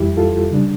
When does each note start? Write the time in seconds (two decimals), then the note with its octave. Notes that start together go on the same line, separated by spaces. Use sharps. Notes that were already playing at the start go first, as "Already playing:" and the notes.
Already playing: F2 E3 G3 E4 G4
0.17 F4 A4
0.51 C#3 G3 D4